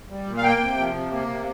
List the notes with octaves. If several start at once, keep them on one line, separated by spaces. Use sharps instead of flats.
G3
A#2
F5
A#3 G5
C3
F3
C3
A#3
C3